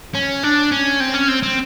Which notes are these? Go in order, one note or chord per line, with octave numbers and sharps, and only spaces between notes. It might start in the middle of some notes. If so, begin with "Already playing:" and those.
C#4
D4
C#4
C4
C#4
C4
C4